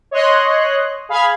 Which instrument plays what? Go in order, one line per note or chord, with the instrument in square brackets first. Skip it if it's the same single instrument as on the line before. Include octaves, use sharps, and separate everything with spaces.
[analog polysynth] C#5 D#5 C6 F#6
G#4 F5 B5 F6 G#6